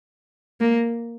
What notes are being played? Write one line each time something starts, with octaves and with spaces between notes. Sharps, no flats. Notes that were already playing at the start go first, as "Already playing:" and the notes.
A#3